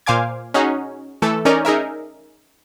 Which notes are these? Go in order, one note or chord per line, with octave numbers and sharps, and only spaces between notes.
A#2 C5 F5 G#5 D6 G#6
C#4 D#4 F#4 G#4
E3 A3 A4
C#4 D#4 A#4 D5
D#4 G#4 A#4 E5